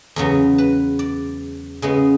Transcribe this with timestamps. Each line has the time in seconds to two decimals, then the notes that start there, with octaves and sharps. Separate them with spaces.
0.16 E2 C#3 F#3 B3
0.58 B4
0.99 D5
1.82 C#3 G#3 B3